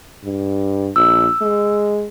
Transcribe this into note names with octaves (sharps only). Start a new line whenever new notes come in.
G2
A#1 E6
G#3